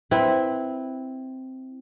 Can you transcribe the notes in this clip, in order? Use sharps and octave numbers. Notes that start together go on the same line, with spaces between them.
C4 E4 B4